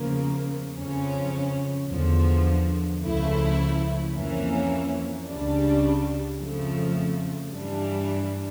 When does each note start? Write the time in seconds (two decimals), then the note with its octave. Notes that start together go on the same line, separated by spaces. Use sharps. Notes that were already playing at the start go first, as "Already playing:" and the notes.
Already playing: E2 C#3 F3 A#3
0.77 F2 C#3 F3 C#4
1.89 E2 D3 F3
3.02 C#2 C#3 F3 A3 E4
4.13 F2 E3 A#3 C#4
5.26 C#2 C#3 G3 D4
6.38 F2 C#3 F3 A3
7.50 G2 E3 G3 D4